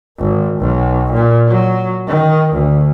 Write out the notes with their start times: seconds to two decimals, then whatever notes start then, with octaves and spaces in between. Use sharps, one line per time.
0.19 G#1
0.60 B1
1.13 A#2
1.48 F#3
2.08 D#3
2.53 D2